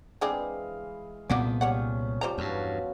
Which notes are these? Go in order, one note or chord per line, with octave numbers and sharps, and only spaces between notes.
E3 G#3 C4 D4 G#4 F5
C2 A#2 F3 A#3 B3 D#4 F#4 D5
G3 C4 C#4 C#5 F#5
F3 G3 C5 A#5
E2 G2 B2 F3 F#3